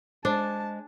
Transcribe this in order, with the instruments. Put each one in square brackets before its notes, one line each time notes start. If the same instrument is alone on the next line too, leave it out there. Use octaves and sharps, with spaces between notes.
[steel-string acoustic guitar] G#3 [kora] D4 [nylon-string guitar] C5 [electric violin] A5